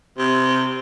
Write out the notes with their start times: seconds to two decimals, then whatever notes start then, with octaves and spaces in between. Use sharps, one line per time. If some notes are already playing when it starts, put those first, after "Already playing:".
0.18 C3